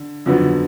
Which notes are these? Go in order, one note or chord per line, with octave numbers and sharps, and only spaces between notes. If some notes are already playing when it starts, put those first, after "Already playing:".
Already playing: D3
F2 D3 F#3 B3